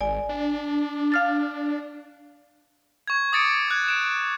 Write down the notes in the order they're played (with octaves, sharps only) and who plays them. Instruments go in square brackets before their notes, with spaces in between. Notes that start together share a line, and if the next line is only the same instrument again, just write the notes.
[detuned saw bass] G#1 [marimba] D5 G#5
[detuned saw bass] D4
[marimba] F5 F6 A6
[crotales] C#6 G#6
D6 D#6 A6 C#7 D7
F#6 G#6
D7 E7